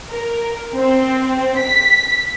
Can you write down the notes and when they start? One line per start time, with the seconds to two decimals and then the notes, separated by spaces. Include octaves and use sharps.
0.10 A#4
0.75 C4
1.58 B6